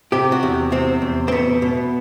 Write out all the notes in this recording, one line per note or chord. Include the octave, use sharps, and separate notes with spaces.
C3 G4
F#4
E2
C3 C4
E2
C4
B2 B3
B2